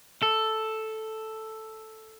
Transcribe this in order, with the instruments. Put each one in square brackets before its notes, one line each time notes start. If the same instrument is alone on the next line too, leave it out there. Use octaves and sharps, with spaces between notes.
[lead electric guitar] A4